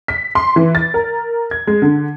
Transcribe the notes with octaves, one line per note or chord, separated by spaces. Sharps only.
B6
C6
E3
A6
A#4
G#6
G#3
D3